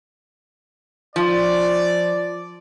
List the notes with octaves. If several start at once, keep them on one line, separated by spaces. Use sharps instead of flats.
F3 D5